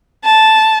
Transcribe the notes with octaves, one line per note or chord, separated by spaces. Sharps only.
A5